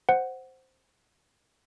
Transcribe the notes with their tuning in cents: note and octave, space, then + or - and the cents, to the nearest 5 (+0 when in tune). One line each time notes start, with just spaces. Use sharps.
C5 +0 F#5 +0